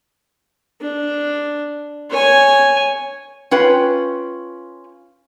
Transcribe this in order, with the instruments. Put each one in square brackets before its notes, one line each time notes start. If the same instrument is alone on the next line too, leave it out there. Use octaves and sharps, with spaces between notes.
[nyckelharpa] D4
C#5 G#5
[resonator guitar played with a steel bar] C#4 F4 B4 G5